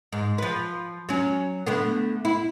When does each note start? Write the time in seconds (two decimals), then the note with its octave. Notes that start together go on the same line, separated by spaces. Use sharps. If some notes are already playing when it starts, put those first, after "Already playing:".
0.12 G#2
0.38 F3 B4
1.09 F#3 C#4
1.66 D3 A3 B3
2.25 E4